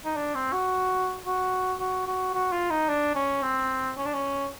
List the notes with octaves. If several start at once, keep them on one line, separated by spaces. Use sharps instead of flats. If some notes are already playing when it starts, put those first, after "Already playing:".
D#4
D4
C4
F#4
F#4
F#4
F#4
F#4
F4
D#4
D4
C#4
C4
C#4
D4
C#4